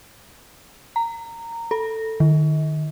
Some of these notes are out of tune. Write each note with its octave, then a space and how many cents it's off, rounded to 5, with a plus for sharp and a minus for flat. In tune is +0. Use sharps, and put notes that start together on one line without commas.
A#5 -15
A4 +10
D#3 -35